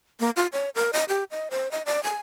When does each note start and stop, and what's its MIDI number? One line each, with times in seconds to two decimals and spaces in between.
0.20 0.30 58
0.37 0.47 65
0.53 0.69 73
0.75 0.91 70
0.93 1.04 75
1.09 1.24 67
1.31 1.48 75
1.51 1.71 72
1.71 1.82 75
1.86 2.03 74
2.03 2.19 80